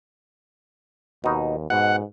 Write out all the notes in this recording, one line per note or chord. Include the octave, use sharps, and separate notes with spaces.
D#2 B2 D#4
G#2 B2 F#5